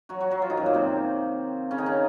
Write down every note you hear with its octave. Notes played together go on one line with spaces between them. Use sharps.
F#3 F#4
F#3 F#4
F#3 F#4
F3 F4
D#3 D#4
F#2 F#3
A#2 A#3
C3 C4
C#3 C#4
D#3 D#4
C#3 C#4